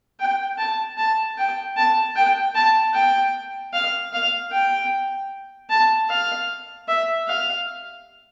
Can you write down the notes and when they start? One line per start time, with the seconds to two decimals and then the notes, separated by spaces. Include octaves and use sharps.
0.20 G5
0.58 A5
0.97 A5
1.38 G5
1.76 A5
2.16 G5
2.55 A5
2.94 G5
3.74 F5
4.13 F5
4.52 G5
5.70 A5
6.10 F5
6.88 E5
7.28 F5